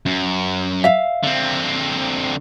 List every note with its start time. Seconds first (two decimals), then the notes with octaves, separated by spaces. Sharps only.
0.06 F#2
0.84 E5 F5
1.23 D3 C4